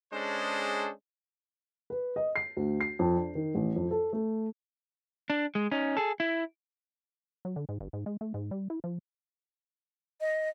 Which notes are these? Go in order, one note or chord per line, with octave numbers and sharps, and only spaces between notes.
G#3 C#4 D4 G#4 A4 C5
B4
D#5
C7
D2
C7
F2
D4
D#3
A1
F2
A4
A3
D4
G#3
C#4 D#4
G#4 A4
E4
F#3
D3
G#2
G1
G#2
G#3
A3
G#2
G3
E4
F3
D#5